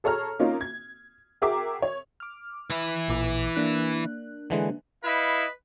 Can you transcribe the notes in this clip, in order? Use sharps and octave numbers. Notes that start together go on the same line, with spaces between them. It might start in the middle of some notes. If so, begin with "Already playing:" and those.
G#4 A4 C#5 A#5 F6
A#3 C#4 D#4 F4
G#6
F#4 G#4 A#4 E5 G5 D6
C#5
D6 F6
E3 E4
A1 A#2 D6
A#3 D4 F#6
D3 E3 G#3
E4 B4 D#5 F5